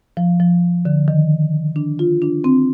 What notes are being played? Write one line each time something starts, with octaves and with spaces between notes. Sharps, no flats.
F3
F3
D3
D#3
D4
F4
D4
C4